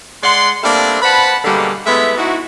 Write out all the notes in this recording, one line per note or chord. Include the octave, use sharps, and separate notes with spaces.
G#3 D5 F#5 C6
G3 A3 A#3 C4 D4
B4 C5 F#5 A5 B5
B2 D3 G3 G#3 A#3
G#3 A3 B3 E4 E5
G#2 D#4 E4 F#4